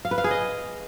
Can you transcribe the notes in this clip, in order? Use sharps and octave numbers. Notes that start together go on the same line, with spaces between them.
F5
B4
F5
G#4
D#5